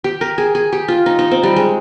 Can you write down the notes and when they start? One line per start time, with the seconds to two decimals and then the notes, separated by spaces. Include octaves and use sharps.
0.04 G4
0.21 A#4
0.38 G#4
0.55 G#4
0.72 G4
0.88 F4
1.06 D#4
1.19 D#4
1.31 C4
1.43 G3
1.56 G#3